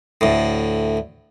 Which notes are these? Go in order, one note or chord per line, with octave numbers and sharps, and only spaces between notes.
D2 A2